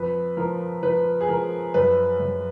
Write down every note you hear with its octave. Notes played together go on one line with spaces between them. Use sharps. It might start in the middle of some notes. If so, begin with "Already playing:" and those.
Already playing: F2 B4
F3 A#4
F3 B4
G#4
F3 A#4
F#2 B4
F#2